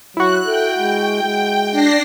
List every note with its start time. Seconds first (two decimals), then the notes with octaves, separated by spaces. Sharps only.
0.17 F#3 E4 F#4 F#6
0.46 A4 G5
0.78 G#3
1.24 G#3
1.71 D4 A#6 C7